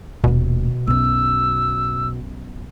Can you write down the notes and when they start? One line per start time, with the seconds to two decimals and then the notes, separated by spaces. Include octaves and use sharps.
0.24 D#1 B2 A3
0.87 B1 F#2 E6